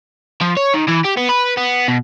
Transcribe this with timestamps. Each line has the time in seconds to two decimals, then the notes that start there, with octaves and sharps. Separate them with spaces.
0.41 F3
0.57 C#5
0.73 D#3
0.88 E3
1.04 G4
1.17 B3
1.29 B4
1.57 B3
1.88 B2